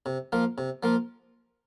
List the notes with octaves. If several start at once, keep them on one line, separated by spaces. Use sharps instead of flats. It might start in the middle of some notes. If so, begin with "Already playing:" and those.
C3
F3 A#3 F4
C3
F3 A#3 F4